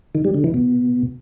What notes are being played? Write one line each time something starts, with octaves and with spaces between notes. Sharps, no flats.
D#3
G3
D3
E3
B2